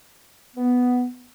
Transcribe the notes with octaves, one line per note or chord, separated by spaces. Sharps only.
B3